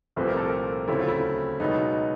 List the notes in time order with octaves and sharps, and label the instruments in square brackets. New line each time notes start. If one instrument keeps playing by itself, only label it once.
[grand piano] C2 A#2 F3 A3 C4 [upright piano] B4
[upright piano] A#4
A4
A#4
[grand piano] D2 C#3 F#3 A3 C4 [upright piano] E4
[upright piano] F4
E4
[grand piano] C#2 B2 F#3 B3 [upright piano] D#4